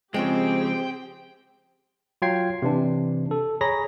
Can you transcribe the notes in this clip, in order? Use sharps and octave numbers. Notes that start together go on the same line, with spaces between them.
C#3 F3 G#3 C4 G4 G#4 C5 G5
F#3 F4 G5 G#6 C7
C3 E3 D4
A4
G#4 C#5 A#5 B5 A#6